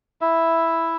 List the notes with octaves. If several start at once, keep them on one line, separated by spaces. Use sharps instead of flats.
E4 E5